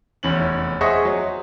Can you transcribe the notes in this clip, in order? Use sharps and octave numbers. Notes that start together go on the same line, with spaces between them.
F1 E2 C#4 F#7
G#4 C5 D#5 E5 F#5 C#6
F#3